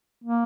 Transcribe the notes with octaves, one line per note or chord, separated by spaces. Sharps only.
A#3